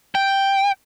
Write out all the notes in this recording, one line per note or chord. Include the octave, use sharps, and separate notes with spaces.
G5